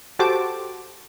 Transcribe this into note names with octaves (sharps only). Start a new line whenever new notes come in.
F#4 G4 A4 C5 A5 D6